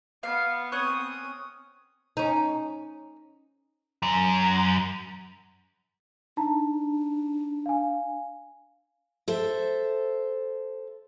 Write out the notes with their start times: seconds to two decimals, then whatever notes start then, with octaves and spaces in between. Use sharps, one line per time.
0.23 B3 F5
0.72 C4 C#4 C#5 C#6 D#6 F#6
2.17 C#4 D#4
4.02 F#2
6.37 D4 D#4 A5 A#5
7.66 F5 G#5
9.28 A4 C5 E5